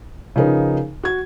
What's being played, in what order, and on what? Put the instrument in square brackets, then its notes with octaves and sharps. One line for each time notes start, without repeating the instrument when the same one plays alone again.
[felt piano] C#3 F3 D#4 A#4 B4
F#4 G#6